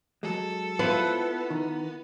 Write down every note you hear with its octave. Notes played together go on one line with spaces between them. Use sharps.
F#3 G#3 A4
B3 E4 F4 C5
D#3